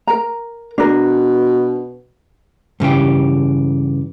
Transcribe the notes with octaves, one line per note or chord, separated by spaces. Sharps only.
A#4 A#5
B2 D4 A#4
G2 C#3 E3 G4